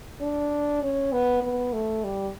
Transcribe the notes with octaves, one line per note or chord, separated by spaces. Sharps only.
D4
C#4
B3
B3
A3
G3